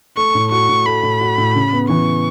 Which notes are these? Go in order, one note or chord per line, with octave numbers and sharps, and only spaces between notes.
A3 C#6
A2
F#4 C#6
A2
A3 B5
A2
F#4
A2
C#3
B3
E3 C#6